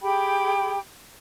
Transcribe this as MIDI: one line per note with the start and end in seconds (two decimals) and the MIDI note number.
0.02 0.78 67
0.02 0.78 68
0.02 0.78 79
0.02 0.78 83